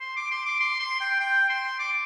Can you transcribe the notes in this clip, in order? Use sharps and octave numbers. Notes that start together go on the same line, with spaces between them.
C6
D6
C6
D6
C6
C6
G5
G5
C6
D6